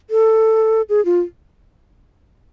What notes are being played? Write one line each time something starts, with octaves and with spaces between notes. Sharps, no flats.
A4
G#4
F4